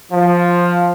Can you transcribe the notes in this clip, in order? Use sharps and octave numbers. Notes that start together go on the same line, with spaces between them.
F3